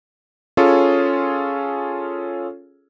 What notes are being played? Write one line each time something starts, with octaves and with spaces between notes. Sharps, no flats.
C#4 F4 G#4 A4 C#5